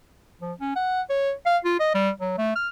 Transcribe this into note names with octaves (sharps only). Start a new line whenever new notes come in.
F3
C#4
F#5
C#5
F5
F4
D#5
G3
F#3
A3
F6